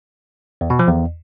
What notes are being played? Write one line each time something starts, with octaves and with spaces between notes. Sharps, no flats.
E2
B2
F3
E2